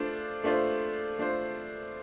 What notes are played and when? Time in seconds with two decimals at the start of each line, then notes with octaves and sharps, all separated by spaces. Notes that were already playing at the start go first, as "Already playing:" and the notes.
Already playing: A3 D4 F4 C5
0.44 A3 D4 F4 C5
1.19 A3 D4 F4 C5